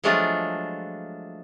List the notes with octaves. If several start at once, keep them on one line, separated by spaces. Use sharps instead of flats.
F3 F#3 G#3 A3 D4 F4